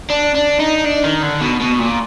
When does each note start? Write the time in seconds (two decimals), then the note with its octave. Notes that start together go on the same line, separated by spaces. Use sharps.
0.10 D4
0.35 D4
0.60 D#4
0.85 D4
1.04 D#3
1.23 D3
1.41 B2
1.60 B2
1.79 A#2